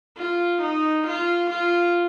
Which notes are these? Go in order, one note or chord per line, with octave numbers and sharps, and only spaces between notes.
F4
D#4
F4
F4